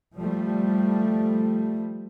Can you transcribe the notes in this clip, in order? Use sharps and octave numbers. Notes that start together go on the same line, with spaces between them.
F3 G3 A3